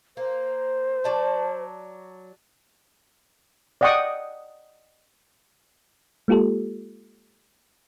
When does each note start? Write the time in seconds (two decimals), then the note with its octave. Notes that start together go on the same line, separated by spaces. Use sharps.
0.17 A#3 C5
1.04 F#3 D5 A5
3.81 D5 D#5 F#5 G5 C#6 D#6
6.28 G#3 A#3 F4 G4 A4